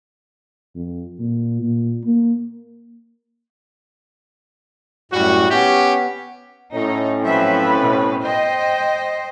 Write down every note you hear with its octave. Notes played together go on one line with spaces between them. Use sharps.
F2
A#2
A#2
A#3
F#2 A2 G3 F#4
B3 C#4 G4
A2 C#4 D#4
F3 F#3 C4 B4 E5
B2
C5 D#5 G5